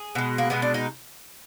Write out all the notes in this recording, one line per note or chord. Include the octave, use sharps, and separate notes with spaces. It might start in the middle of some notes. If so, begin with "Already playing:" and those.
Already playing: G#4
B2 G#3
A#3
B2 G#3 B3
D4
D#4